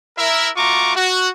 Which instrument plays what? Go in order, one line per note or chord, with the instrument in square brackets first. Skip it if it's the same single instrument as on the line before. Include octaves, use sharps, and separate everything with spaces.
[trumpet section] E4 A#4 E5
A3 F4 F#4 A#5 C#6 D6
F#4